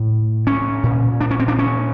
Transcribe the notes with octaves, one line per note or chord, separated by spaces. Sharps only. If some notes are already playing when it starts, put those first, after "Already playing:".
Already playing: A2
C#4
A#2
D4
C#4
C4
D4
C#4